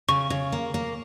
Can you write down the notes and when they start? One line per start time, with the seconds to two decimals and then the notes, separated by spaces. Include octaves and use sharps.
0.08 C#3 C#6
0.30 C#3
0.52 A#3
0.74 A#3